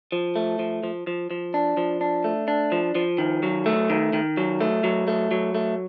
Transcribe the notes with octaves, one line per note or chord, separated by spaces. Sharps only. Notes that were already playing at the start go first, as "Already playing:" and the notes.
F3
A3
F3
F3
F3
F3
D4
F3
D4
A3
D4
F3
F3
D#3
F#3
A3
D#3
D#3
F#3
A3
F#3
A3
F#3
A3